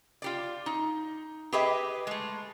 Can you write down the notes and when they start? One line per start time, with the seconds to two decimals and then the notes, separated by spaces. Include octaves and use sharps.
0.22 F4 G4 D5
0.66 D#4
1.53 G4 G#4 B4 D#5 E5 G5
2.07 G#3 A3